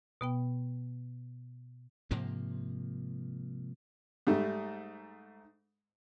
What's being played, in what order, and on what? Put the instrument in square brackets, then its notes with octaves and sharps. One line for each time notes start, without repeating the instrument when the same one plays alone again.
[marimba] B2 B3 G5
[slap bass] G#2 C3 F3 A#3
[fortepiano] G#2 G3 A3